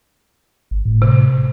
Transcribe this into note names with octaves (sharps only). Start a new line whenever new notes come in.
G1
A2
C3